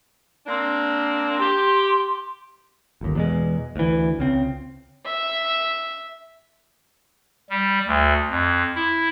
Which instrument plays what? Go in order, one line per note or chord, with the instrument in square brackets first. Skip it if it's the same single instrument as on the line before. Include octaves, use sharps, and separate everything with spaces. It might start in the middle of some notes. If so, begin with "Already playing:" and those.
[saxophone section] A#3 C4 D4
[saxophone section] G4 [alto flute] C6
[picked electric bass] G1 D#2
E2 B2 G#3
D2 E3
C#2 C#3 C4
[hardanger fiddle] E5
[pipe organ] G3
D2
F2
E4